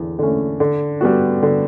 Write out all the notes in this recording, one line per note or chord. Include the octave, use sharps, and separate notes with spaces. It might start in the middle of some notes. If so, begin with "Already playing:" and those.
Already playing: E2 D3
D3 A3 C#4
D3
G3 B3 F#4
D3